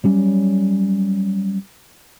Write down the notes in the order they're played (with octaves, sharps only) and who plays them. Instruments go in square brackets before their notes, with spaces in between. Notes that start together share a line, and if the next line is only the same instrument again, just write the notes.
[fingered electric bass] F#3 G3 C#4